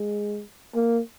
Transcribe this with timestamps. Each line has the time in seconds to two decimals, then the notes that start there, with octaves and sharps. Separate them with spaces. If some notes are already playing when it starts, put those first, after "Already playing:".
Already playing: G#3
0.75 A#3